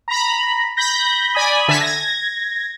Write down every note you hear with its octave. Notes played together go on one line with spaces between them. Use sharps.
A#5 B5
B5 G6 A#6
D5 G#5 B5 D#6
D3 E5 G#5 A5 B6
G#6 A#6